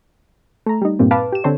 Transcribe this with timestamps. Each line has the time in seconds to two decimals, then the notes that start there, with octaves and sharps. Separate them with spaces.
0.66 A3 A#5
0.82 G3 D#4
0.99 G2 A#2 C4
1.11 B4 F5 A5 D6
1.32 G4 E7
1.44 D3 C4 A4 C5 C#5